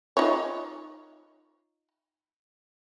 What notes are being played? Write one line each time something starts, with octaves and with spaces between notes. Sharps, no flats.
D#4 F4 C#5